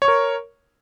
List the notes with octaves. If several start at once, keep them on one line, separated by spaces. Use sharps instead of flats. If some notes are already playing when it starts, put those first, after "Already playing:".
A#4 C#5 C#6